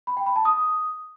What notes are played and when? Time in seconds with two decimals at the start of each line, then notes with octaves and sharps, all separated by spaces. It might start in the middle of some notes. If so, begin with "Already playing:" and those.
0.07 B5
0.17 G5
0.26 B5
0.36 A5
0.45 D#6